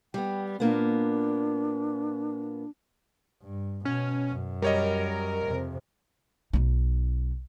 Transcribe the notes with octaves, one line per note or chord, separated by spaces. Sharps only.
G3 B3 G5
A#2 A#3 B3 D4
G2
B2 C#4
F#2
G3 A#4 C#5 D#5
F2 C3
B1 D#4